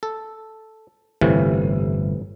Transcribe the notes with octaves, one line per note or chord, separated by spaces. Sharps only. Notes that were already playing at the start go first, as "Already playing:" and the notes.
A4
G1 A2 C3 E3